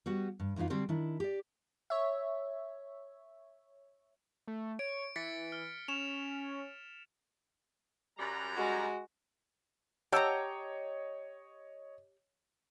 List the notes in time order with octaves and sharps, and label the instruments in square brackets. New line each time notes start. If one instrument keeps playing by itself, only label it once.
[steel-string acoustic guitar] G3 B3 F#4 F#5
G2
F2 E3 B3 D#4 F4
D3 F#3 G3 C4 C5 D5
D#3 D4 E4
G4 D5
[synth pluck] C#5 E5
[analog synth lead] A3
[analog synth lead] C#5 [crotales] D7
[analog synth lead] E3 [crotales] A6 B6 C#7
[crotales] F6
[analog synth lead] C#4 [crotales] E7 F7
[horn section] F#2 G3 A#5
[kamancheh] G#3 F#4
[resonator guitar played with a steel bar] G4 A#5 [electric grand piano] C#5 D#5 [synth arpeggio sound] F#5 A5 E6